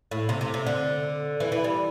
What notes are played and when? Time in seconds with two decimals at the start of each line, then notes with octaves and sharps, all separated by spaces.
0.11 A2
0.29 C3
0.41 C3
0.54 C3
0.67 D3
1.40 E3
1.52 E3
1.64 G3